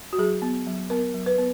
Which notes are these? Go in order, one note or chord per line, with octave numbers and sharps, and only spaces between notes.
F#4
F#3 G#4
B3
F#3
B3 A#4
F#3
B4
B3